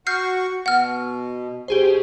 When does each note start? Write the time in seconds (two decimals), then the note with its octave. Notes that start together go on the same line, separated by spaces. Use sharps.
0.07 F#4 C#6 F6 G6 C7
0.66 B2 F#5 F6
1.68 B2 G4 G#4 C5